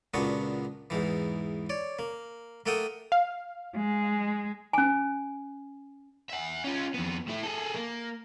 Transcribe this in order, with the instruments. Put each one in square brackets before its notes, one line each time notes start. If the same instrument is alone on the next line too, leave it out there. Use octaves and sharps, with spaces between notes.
[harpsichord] C#2 A#2 B3 D4 F#4 C#6
E2 G#2 E3
C#5 D5
A#3
A3 A#3 A4 F#5 G5 D#6
[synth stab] F5
[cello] G#3
[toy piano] C#4 G#5
[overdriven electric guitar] E5 F#5
C#4 F4
F2 B3
A2 E4
G#4 A4
A#3